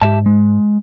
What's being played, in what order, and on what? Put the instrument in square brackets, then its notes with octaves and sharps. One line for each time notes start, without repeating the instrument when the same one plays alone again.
[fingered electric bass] G#2 [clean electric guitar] G4 E5 A5
[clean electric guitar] G#3